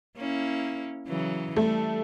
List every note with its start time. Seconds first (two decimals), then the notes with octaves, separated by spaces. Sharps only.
0.17 A#3 C#4 E4
1.08 C#3 E3 F#3
1.56 G3 A3